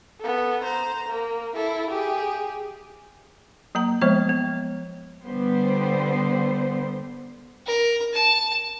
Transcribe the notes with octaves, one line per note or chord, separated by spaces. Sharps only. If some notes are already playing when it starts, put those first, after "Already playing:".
B3 A4
C5 A#5
A#3
E4 A4
G4 G#4
F#3 A#3 A#5
F3 G#3 B3 C5 D#5
B3
D3 G3 B3 C5
A#4
A5